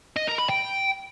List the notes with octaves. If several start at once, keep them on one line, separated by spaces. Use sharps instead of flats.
D#5
A#4
B5
G5